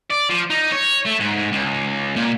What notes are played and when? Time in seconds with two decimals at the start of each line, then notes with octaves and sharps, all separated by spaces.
0.10 D5
0.30 F3
0.50 D#4
0.72 C#5
1.05 A3
1.20 G#2
1.52 C#2
2.16 A#2